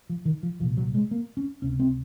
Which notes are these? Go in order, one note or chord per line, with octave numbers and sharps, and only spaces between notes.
F3
D#3
F3
C2 A#2 F3
F#3
G#3
A#3
C#4
C#2 C3 C#4
C4